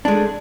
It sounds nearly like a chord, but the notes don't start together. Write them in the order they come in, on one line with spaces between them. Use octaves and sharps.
D4 G#3 A3